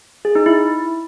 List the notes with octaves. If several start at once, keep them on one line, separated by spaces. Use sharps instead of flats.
G#4
D#4
E4